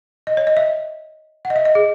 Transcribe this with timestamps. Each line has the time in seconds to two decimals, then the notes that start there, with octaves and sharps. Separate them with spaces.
0.27 D#5
0.37 C#5
0.47 D#5
0.57 E5
1.45 F#5
1.50 D#5
1.56 E5
1.65 D#5
1.75 G#4